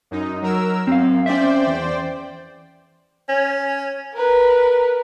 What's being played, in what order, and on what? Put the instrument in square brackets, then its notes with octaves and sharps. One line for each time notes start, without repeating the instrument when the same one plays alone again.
[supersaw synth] F#2 D#4
F#3 A#4 E6
[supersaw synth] F#2 [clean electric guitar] C4 F5
[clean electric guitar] C#4 E5 [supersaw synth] C5 D5 G5
[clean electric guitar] E2
[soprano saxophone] C#4
[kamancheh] A#4 B4